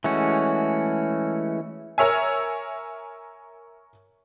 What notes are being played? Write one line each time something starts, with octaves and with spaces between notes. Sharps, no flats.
E3 G#3 A3 C#4 F#4
A#4 C#5 E5 G#5